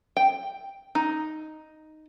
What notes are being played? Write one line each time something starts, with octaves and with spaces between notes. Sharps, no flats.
G5
D#4